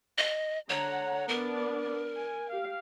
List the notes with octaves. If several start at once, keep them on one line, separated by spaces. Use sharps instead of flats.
D#5
D3 C#5 F#5 A#5
B3 D4 A#4 D5
G#5
G4 F5